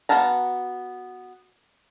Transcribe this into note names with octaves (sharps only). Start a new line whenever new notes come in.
B3 F#4 F5 A5 A#5